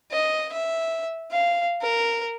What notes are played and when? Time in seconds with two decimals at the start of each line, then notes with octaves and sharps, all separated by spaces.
0.11 D#5
0.53 E5
1.31 F5
1.81 A#4